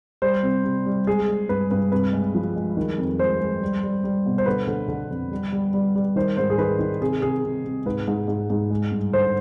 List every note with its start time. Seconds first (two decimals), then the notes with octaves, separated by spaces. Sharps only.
0.22 G3 C5
0.43 C3
0.64 C3
0.86 G3
1.07 G#3 G#4
1.28 G#3
1.49 G2 B4
1.71 G2 B4
1.91 C3 B4
2.13 G#3
2.35 F3
2.56 G#3
2.77 D#3
2.98 F2
3.19 G#3 C5
3.40 G#3
3.62 G3
3.83 G3
4.04 G3
4.26 B2
4.38 C5
4.46 D3 B4
4.67 D3
4.88 D3
5.11 F2
5.31 G3
5.52 G3
5.74 G3
5.96 G3
6.16 D#3 C5
6.37 G#2 C5
6.50 G#4
6.58 D#3 B4
6.79 D#3
7.00 C3 G#4
7.22 C3 G#4
7.44 C3
7.65 C3
7.86 G#2 B4
8.08 G#2
8.28 G#2
8.50 G#2
8.70 G#3
8.91 G2
9.13 D3 C5